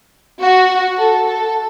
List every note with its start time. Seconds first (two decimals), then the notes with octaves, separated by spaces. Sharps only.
0.41 F#4
0.98 A4
1.27 A4